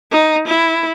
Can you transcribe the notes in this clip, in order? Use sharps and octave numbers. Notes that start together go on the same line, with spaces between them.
D#4
E4